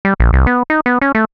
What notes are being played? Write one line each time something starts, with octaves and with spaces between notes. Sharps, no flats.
G3
A#1
C2
B3
D#4
B3
C#4
A3